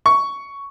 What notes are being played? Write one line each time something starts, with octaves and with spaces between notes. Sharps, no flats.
C#6